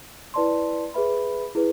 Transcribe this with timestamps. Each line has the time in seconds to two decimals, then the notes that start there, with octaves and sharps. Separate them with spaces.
0.34 E4 B4 D5 A5 C6
0.94 G#4 B4 E5 B5
1.55 E4 G#4 B4